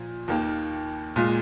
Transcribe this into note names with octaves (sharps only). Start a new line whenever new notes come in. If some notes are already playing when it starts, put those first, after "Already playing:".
Already playing: A#2 F3
D#2 D#3 A#3
A#2 G#3 F4